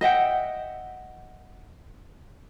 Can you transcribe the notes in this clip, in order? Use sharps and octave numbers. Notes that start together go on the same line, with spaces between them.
D#5 E5 F#5 G5